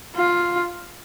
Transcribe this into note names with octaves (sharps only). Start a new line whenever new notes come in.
F4